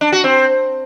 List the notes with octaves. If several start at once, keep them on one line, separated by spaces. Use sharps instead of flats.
D4
F#4
C4